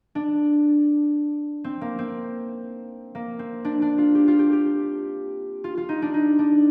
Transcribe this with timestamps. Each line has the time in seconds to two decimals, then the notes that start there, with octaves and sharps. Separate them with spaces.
0.15 D4
1.64 C4
1.81 A#3
1.99 C4
3.15 A#3
3.39 C4
3.65 D4
3.82 D4
3.98 F4
4.15 G4
4.28 F4
4.39 G4
4.53 G4
5.64 F4
5.77 F4
5.89 D#4
6.02 D4
6.14 D#4
6.39 D4